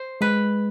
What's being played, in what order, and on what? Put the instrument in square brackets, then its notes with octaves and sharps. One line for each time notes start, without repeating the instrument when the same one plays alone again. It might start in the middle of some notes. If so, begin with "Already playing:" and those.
Already playing: [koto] C5
[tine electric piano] G#3 [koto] B4